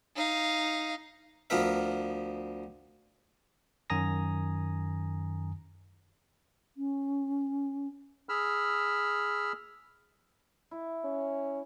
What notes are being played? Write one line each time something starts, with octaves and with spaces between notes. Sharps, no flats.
D#4 F5
D2 F3 B3 A#4 E5
F#2 D#3 G#5 A#5 D#6 A#6
C#4
G#4 B5 E6 F6
E4
C#4